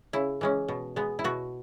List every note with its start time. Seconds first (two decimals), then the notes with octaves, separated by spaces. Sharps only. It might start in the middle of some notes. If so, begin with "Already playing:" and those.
0.13 C#3 E4
0.41 E3 G#3 C#4
0.68 B2
0.96 G#3 B3
1.19 E4
1.24 B2 F#4